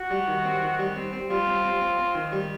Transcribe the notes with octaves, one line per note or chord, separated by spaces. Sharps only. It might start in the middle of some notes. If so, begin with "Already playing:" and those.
Already playing: F#4
G3
D#3
C4
D#3
G3
C4
C4
G3 F4
C4
C4
C4
C4
D#3
G3